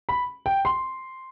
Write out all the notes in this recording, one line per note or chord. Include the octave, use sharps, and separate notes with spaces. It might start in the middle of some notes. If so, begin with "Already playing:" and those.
B5
G5
C6